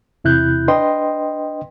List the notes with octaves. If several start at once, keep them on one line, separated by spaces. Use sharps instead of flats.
E2 C3 E4 F#6 G6
D4 B4 D#5 G5 C6